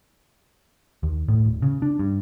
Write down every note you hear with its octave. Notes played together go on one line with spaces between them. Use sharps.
D#2
A2
D#1
C#3
D4
G2